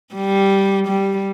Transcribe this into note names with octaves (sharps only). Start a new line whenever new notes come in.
G3
G3